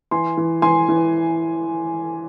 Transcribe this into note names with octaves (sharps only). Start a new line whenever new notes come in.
E3 G#5 C6
E3
E3 G#5 C6
E3